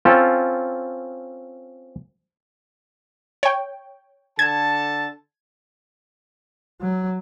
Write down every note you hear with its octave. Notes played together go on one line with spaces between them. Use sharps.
C4 C#4 F4 A4
C#5 G5
D3 A4 A5 G#6
F#3